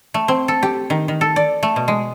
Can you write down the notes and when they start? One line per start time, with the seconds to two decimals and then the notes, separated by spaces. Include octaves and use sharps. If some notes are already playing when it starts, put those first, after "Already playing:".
0.14 A3
0.28 C4
0.48 A4
0.63 G4
0.90 D#3
1.08 D#3
1.21 A4
1.36 D5
1.63 A3
1.76 B2
1.88 G#3